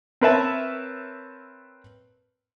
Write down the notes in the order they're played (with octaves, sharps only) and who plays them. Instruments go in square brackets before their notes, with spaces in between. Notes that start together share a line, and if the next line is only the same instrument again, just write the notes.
[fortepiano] C4 A#4 B4 C#5 E5 A5